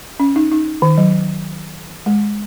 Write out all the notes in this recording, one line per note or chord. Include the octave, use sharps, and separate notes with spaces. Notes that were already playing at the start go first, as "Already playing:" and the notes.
C#4
D#4
D#4
D#3
F#3
G#3